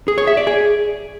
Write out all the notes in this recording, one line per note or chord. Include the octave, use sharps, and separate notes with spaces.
G#4
C#5
E5
D5
G#4